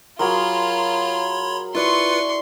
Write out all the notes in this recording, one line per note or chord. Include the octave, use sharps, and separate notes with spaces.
F#3 F4 G#4 A#4 C#5 B5 C6
E4 F4 B4 D5 C6 C#6 C#7